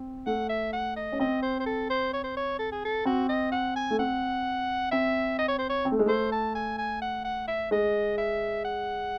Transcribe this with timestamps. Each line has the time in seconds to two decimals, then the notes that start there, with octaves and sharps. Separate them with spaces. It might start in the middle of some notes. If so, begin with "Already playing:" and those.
Already playing: C4
0.26 A3 F#5
0.49 E5
0.73 F#5
0.96 D#5
1.12 C#4
1.20 C4 D#5
1.43 C5
1.60 C5
1.66 A4
1.90 C5
2.13 C#5
2.24 C5
2.37 C#5
2.59 A4
2.72 G#4
2.85 A4
3.05 C4 F#4
3.29 D#5
3.52 F#5
3.76 G#5
3.91 A3
3.99 C4 F#5
4.92 C4 E5
5.39 D#5
5.48 C#5
5.58 C5
5.69 C#5
5.85 C4
5.92 A3
5.99 G#3
6.06 A3 C5
6.32 A5
6.55 G#5
6.78 G#5
7.02 F#5
7.25 F#5
7.48 E5
7.71 G#3 D#5
8.18 E5
8.65 F#5